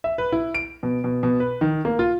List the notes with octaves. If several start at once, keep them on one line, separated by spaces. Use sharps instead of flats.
E5
B4
E4
D7
B2
B2
B2
B4
D#3
A#3
F4